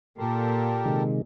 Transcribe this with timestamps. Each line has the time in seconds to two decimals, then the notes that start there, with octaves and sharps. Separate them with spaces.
0.18 A#2 G4 A4 A#4
0.86 C3 D#3 G#3